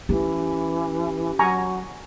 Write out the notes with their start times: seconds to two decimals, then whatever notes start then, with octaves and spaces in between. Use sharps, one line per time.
0.09 E3 C#4 G4
1.39 F#3 G#5 A#5 C#6